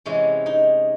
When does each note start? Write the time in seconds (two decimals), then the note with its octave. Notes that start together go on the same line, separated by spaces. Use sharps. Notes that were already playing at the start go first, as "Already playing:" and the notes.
0.06 C3 E3 G#3 C#4
0.46 D#4